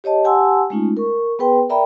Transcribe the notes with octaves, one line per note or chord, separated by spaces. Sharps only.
G4 C#5 D#5 A5
G4 F#5 G#5 A5 C6 E6
G#3 A3 C#4 D#4 F4
A#4 C#6
B3 G#4 B4 G5 C6
A#4 D5 E5 G5 A#5 B5